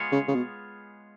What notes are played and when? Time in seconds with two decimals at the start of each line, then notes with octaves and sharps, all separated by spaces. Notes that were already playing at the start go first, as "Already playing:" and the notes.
Already playing: G#3 B3 F4 G#4 C#5
0.12 C#3
0.28 C#3
0.35 B2